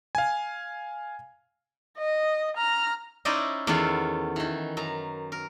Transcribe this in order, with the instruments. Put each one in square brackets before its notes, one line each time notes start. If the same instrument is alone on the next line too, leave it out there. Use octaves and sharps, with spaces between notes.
[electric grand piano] F5 G#5
[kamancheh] D#5
A#5 F6
[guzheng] C#4 D#4 E4 C5 D5 D#5
E2 D#3 B3 C#4 A4 F5
D#3 E3
F#2 A#5
A#4